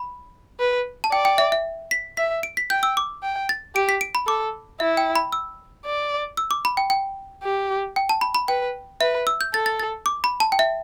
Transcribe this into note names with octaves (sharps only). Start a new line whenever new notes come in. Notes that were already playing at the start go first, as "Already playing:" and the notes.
Already playing: B5
B4
A5
D5 G5
G5
E5
E5
B6
E5 B6
D7
B6
G5 G6
E6
D6
G5
A6
G4 D7
B6
D7
B5
A4 D6
E4 E5
G5
B5
E6
D5
E6
D6
B5
G5
G5
G4
G5
A5
B5
B5
B4 G5
B4 E5
E6
G6
A4 A6
A6
A6
D6
B5
A5
G5
E5